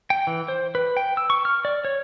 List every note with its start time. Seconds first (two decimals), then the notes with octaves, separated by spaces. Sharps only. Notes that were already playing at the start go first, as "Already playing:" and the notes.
0.10 G5
0.27 E3
0.48 C5
0.75 B4
0.97 G5
1.17 E6
1.30 C#6
1.45 F6
1.65 D5
1.85 C#5